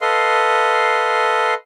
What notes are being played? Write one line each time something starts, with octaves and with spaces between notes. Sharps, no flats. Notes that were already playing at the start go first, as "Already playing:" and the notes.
A4 B4 D#5 F5 C6